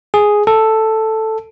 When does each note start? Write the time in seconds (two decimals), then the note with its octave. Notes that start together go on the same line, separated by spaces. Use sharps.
0.14 G#4
0.47 A4